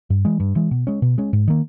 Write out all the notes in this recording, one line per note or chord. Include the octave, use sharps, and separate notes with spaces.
G2
E3 G#3
G2
E3 G#3
B2
G#3 C#4
B2
G#3 C#4
G#2
D#3 A#3